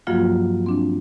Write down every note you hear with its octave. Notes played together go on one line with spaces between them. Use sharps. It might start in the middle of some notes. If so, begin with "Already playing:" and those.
G2 F3 F#3 A#3 F4 F#4
C4 D4